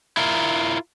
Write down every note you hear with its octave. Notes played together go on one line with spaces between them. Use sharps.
E4 F4 A#4